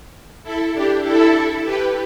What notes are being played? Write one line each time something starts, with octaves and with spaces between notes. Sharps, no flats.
E4 A4
D4 G4
E4 A4
G4 B4